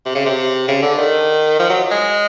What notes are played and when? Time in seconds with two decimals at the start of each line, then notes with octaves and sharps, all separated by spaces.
0.06 C3
0.15 C#3
0.25 C3
0.68 C#3
0.82 D3
0.98 D#3
1.59 F3
1.69 F#3
1.91 G#3